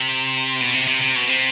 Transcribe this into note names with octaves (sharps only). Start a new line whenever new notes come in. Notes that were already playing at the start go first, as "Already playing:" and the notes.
Already playing: C3
B2
C3
C3
C3
B2
C3